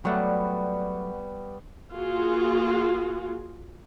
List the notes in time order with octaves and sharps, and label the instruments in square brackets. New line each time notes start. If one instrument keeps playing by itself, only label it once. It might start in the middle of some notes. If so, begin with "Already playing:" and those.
[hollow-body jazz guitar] F#3 A3 [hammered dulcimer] G3 B3 C#6 [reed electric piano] D5 F#5 G5
[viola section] A#3 F4 F#4 G#4